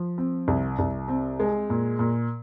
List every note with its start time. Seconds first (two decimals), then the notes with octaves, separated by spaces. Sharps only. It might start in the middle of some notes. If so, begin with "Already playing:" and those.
Already playing: F3
0.18 C4
0.48 C2
0.79 C2
1.08 C4
1.40 G#3
1.70 A#2
1.99 A#2